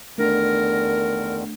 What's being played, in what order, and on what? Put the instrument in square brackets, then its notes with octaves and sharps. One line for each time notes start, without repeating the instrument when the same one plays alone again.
[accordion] E2 D3 D#3 [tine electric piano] A3 D4 [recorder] A#4